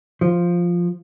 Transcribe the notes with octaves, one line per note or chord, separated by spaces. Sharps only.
F3